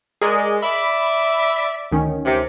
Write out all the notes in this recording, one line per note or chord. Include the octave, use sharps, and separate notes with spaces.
G#3 G#4 A#4 D5
D5 E5 B5
D2 D#3 C#4
C3